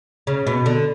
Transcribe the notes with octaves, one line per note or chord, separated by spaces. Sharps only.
C#3
B2
D3